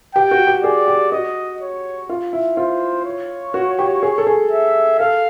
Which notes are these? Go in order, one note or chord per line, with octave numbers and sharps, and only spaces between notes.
G4 G5
F#4
G4
G#4 D5
G4
F#4 D#5
C#5
F4
E4
F4 C5
C#5
F#4
G4
G#4
A4
G#4
E5
A4 F5